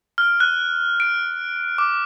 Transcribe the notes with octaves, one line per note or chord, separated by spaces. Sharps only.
F6
F#6
D7
D6